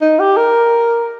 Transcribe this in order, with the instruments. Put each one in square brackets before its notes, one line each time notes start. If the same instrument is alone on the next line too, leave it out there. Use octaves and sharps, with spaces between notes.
[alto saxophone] D#4
G4
A#4